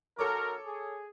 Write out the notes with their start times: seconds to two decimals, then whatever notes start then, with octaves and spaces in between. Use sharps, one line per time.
0.19 B1 F#4 A4 A#4 C#5 D6
0.66 G#4